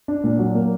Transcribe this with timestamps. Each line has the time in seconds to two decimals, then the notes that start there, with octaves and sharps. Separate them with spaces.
0.08 D4
0.24 A#2
0.39 F#3
0.55 A#3